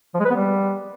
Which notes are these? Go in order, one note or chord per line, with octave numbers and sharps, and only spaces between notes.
F3
G#3
B4
B3
G3